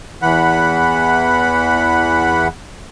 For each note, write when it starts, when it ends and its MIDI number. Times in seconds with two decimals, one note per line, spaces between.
0.22 2.48 40
0.22 2.48 52
0.22 2.48 78
0.22 2.48 83